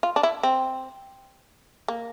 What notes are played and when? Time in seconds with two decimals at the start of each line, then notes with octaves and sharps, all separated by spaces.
0.03 F4
0.16 D4
0.23 E4
0.43 C4
1.88 A#3